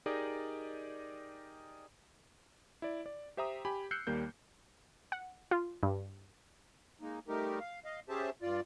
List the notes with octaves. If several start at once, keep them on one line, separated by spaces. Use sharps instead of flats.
D#4 G4 G#4 A#4 D5 D#5
E4 D5
D5
G4 C5 E5 G5 A#5 D#6
G4 G#5 B5
E6 F#6 G6 C7 C#7
D#2 G3 A#3 G6
F#5
F4
G2
G#3 A#3 D#4
G3 A3 D#4 G4 A#4
F5
D#5 F5
C#4 G4 G#4 C5 E5 A5
G2 F4 D5